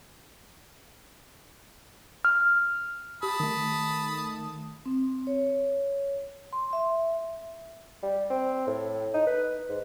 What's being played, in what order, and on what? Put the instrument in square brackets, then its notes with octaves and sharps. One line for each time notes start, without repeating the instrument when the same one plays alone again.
[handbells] F6
[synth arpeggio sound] G4 [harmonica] A5 B5 D#6
[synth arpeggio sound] D#3 A3
[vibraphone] C4
C#5
C6
E5
[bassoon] G3
C4
A2
D#4
B4
G#2